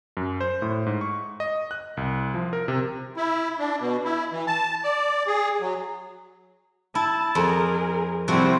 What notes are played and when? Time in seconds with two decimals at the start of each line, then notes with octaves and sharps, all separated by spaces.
0.17 F#2
0.41 C5
0.62 A2
0.86 G#2
1.01 C#6
1.40 D#5
1.71 F#6
1.97 C2
2.34 F3
2.53 A#4
2.68 C3
3.17 E4
3.59 D4
3.80 B2
4.05 E4
4.32 E3
4.47 A5
4.84 D5
5.27 G#4
5.61 F#3
6.95 E4 A5
7.35 F2 G#4 A#4
8.28 C3 F3 G3 C4 E4 F#4